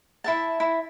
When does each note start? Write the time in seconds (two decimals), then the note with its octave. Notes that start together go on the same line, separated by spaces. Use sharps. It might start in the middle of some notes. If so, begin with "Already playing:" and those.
0.24 E4 E5 A5
0.60 E4